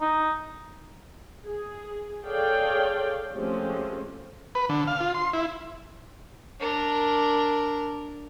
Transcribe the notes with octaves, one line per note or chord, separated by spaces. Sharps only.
D#4
G#4
G#4 A4 C#5 D5 F5 G5
F3 G#3 A3 C4 C#4 G4
B4
D3
F5
F4
C6
E4
D4 A#4